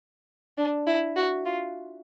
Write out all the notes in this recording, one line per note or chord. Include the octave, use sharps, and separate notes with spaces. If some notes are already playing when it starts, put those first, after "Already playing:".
D4
E4
F#4
F4